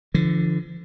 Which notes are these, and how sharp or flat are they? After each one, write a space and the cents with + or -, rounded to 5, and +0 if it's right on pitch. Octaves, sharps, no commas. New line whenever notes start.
D3 +0 F3 -40